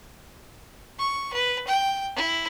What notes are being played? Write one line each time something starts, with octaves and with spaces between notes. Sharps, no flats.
C#6
B4
G5
E4